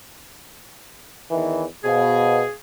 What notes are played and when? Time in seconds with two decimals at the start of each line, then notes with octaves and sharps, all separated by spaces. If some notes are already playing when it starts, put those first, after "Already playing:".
1.31 E2 D#3 E3
1.84 B2 G#4 C5 F5